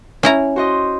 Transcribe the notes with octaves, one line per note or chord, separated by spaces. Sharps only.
C#4 E4 A#5
F#4 C5 D#5